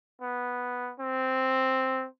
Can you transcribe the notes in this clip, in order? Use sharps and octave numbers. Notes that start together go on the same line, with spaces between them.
B3
C4